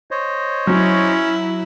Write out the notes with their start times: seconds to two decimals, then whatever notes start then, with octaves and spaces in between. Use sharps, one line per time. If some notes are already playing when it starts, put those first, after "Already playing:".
0.11 C5 C#5 D#5
0.67 F#3 C#4 E4